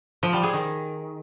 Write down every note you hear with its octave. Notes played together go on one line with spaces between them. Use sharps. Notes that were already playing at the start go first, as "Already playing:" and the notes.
F3
G3
G#4
D#3